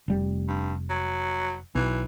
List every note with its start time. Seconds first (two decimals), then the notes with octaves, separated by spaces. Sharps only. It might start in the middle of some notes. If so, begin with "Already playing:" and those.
0.08 F1 G3
0.48 G2
0.89 F#3
1.75 B1 E3